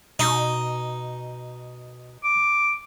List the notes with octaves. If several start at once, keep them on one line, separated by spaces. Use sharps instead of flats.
B2 D#4
D6